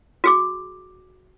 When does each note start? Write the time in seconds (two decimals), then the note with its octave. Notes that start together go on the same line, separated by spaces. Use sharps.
0.24 F#4 G#4 D6